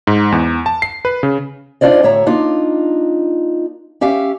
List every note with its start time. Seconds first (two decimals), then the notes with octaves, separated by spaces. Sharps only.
0.07 G#2
0.32 E2
0.66 A5
0.82 C7
1.05 B4
1.23 C#3
1.81 D4 D#4 F4 C5 D5 D#5
2.03 D2 A2 C#5 E5 A#5
2.26 A#3 D4 D#4 F4
4.01 C#4 G4 E5 F5